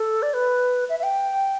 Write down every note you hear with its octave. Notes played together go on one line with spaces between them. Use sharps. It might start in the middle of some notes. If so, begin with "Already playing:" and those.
Already playing: A4
D5
B4
E5
E5
G5